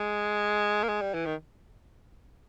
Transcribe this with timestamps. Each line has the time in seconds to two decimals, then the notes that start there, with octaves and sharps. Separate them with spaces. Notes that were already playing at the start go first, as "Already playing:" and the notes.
Already playing: G#3
0.84 A#3
0.89 G#3
1.01 G3
1.14 E3
1.26 D#3